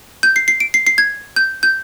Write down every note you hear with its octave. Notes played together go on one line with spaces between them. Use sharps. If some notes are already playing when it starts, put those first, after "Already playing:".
G6
C7
C7
D7
C7
C7
G#6
G6
G6